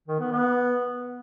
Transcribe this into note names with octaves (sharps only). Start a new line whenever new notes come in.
D#3
B3
B3